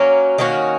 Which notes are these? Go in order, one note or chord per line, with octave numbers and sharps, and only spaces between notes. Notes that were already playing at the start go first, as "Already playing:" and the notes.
Already playing: F#3 A#3 C#4
D#3 A#3 C#4 F#4